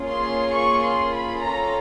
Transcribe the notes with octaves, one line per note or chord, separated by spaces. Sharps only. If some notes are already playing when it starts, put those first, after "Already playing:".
Already playing: A#3 C#4 F4 G#4
C6
C#6
C6
B5
C#4 F4 A4 A#5